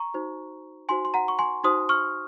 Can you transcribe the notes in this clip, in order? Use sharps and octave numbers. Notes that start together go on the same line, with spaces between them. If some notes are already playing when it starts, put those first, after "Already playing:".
Already playing: A#5 C#6
D#4 F#4 C5
D#4 F#4 C5 G#5 C6
C6
F#5 A#5
C#6
G#5 C6
D#4 F#4 C5 C6 D#6
C#6 F6